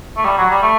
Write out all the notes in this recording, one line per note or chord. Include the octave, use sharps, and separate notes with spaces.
A3
G3
F#3
G3
A3